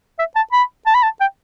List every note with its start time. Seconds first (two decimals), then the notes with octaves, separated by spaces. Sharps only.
0.19 E5
0.36 A5
0.52 B5
0.86 A5
0.94 B5
1.03 A5
1.20 G5